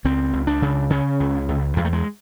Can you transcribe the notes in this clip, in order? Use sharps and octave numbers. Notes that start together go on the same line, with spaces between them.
C#2 C4
C#2
D4
C#3
C#3 C#4
C#2
C#2
E2 G#3
A3
G#3